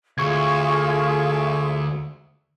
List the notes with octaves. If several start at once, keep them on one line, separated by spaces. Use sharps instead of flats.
D2 F4 G#4 F5 C#6 G#6